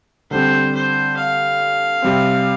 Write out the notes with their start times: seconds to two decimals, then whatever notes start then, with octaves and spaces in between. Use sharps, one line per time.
0.31 D3 G3 C4 C5
0.74 C5
1.17 F5
2.02 C3 G3 C4